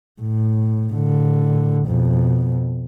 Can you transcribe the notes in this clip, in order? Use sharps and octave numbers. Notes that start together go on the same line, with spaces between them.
A2
A2 D3
F2 B2